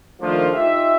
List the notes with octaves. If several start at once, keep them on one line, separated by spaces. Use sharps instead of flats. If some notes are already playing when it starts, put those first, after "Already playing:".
D#3 F3 A3 A#3 D4 F4
D#4 F4 G4 E5